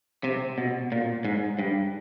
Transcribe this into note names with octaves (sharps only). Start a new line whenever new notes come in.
C3
B2
A#2
G#2
G2